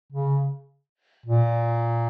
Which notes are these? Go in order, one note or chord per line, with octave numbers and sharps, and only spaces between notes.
C#3
A#2